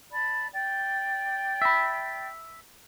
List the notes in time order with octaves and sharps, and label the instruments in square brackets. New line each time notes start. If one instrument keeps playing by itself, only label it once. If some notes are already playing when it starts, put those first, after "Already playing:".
[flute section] D5 A5 B5
D5 G5
[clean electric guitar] E5 B5